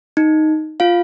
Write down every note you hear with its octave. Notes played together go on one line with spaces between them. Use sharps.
D#4
F4 F5